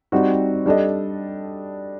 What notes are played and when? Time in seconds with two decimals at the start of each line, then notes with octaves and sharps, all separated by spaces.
0.12 G3 C4 D#4 F#4
0.66 G3 D4 A4 D#5